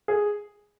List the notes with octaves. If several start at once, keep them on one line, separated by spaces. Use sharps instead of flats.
G#4